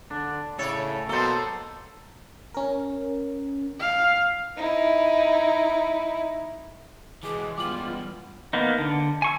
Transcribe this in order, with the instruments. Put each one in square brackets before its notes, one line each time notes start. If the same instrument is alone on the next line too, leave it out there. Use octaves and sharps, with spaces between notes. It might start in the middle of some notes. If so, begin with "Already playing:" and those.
[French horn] D3 [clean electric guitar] D4
[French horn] A2 [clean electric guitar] C#3 A4 [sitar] C#5 D5
[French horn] B2 [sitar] F#3 A4 [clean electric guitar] A#3 C5
[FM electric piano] C#4 A#4
[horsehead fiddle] F5
[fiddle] D#4 E4
[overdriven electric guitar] E3 G#3 [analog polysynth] G#4 F#5 A5 [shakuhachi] D6
[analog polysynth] F#2 E3 G#3 [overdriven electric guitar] G3 B3 [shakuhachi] F4 [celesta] D6 F#7
[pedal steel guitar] A#3 B3 D#4
D3
G#5 C#6 E6